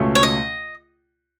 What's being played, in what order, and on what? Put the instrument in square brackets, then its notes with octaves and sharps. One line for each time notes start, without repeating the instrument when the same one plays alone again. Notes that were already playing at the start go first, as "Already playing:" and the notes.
Already playing: [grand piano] C#2 B2 A3 C#4
[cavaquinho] C#5
D#5